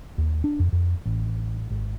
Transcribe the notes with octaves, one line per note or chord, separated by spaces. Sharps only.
D#2
D4
F2
F2
A1
G#1